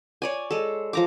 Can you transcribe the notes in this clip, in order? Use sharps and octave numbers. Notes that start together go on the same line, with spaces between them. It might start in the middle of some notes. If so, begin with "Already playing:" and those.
C#5 D5 G#5
G#3 A4
F3 A#5 D6